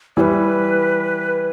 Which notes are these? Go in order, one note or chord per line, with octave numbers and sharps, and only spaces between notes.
E3 G3 B4 D5